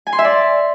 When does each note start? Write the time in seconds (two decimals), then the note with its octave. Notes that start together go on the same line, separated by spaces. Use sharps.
0.07 G#5
0.13 C6
0.19 E5
0.25 D5